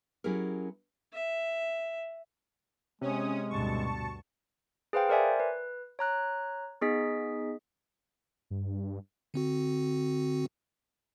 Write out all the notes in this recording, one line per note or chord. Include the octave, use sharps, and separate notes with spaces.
F#3 C#4 E4 G4 G#4 A#4
E5
C3 G#3 C#4 D#6
D2 G2 B2 A5 C#6
G#4 B4 C5 F5 G5
A#4 C5 D5 E5 G#5
B4
C#5 A#5 F#6
B3 D#4 G#4 D#5 B6
G2
D3 C4 F#4